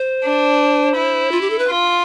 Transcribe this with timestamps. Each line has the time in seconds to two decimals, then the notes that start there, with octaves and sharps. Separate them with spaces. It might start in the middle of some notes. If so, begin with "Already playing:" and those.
Already playing: C5
0.24 D4
0.96 E4
1.32 F4
1.41 G4
1.50 A4
1.59 B4
1.68 F4